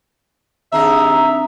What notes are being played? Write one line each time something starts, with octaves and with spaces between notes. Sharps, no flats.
D#2 C4 D4 G#4 D#5 E5 A#5